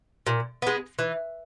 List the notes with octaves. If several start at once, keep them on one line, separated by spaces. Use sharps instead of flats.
A#2
G#3 B3
E3